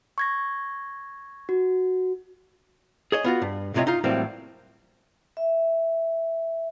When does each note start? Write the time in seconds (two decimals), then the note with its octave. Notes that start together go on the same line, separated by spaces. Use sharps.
0.18 C#6 G#6 A#6
1.49 F#4
3.12 G#4 C#5 D#5
3.24 B3 F4 F#4
3.42 G2
3.74 B1 A2 C3 F4 C#5 D#5
3.87 D#4 F4
4.04 A2 E3 F#3 G3 A#3 C4
5.37 E5